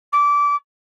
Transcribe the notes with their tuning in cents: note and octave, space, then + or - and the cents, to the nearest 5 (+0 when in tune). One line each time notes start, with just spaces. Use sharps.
D6 -20